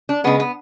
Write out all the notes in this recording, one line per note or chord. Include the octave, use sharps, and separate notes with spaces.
D4
C#3 G#3 B3
B3